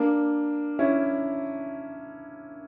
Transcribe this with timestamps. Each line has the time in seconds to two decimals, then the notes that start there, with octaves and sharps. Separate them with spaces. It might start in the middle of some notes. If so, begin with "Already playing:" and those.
Already playing: A#3 D4
0.79 C#4 E4